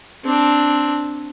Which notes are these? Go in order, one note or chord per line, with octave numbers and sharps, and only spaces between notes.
C4 D4